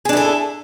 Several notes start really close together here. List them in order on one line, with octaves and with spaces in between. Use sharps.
G#4 D4 E4 A4